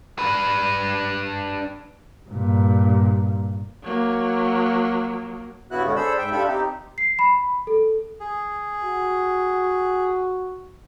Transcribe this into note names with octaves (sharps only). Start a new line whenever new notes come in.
D4 B4
G2 A#2
F#3 A#3
G2 C#3 B3 E4 F#4 F#6
B2 D3 G#3 B3 C#4
D4 G#4 A4 C5 B5 E6
G#2 E5 G5
D4 F4 G4 A4 E5 B5
C4 D#4 G4
C7
B5
A4
G#4
F#4